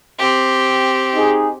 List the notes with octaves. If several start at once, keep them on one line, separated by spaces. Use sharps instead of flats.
C4 G4
D#4 G#4